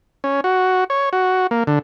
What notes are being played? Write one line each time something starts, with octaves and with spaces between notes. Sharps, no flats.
C#4
F#4
C#5
F#4
A#3
D3